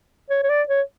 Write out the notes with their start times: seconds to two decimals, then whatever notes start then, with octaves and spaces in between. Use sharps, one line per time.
0.30 C#5
0.43 C#5
0.49 D5
0.68 C#5